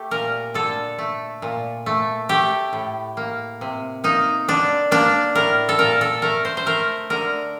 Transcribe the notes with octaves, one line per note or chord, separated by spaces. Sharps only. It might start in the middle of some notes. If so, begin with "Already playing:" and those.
Already playing: A3 G4
A#2 A#4
D3 A4
A3
A#2
A3
A3 G4
A2
A#3
C3
A#3 D#4
D3 D4
A#3 D4
A2 A#4
A4
A#2 A#4
A4
A3 A#4
C5
C5
A3 A#4
D3 A#4